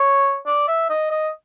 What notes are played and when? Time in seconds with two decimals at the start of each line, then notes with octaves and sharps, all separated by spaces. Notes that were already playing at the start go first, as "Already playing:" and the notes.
Already playing: C#5
0.47 D5
0.68 E5
0.90 D#5
1.11 D#5